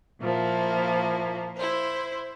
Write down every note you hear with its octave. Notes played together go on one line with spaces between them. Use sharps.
A#2 F3 A#3 E4
E4 C5